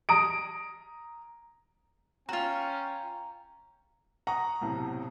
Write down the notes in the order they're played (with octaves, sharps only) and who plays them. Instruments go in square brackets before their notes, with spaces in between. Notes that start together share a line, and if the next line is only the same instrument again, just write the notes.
[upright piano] A#5 D#6 D7
[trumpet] C#4 [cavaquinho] F4 F#4 [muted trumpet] G5 [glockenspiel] A#5
[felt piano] F#5 C#6 D#6 [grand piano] A#5
[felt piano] B1 A2 C3